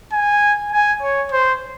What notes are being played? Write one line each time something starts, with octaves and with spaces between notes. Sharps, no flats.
G#5
G#5
C#5
C5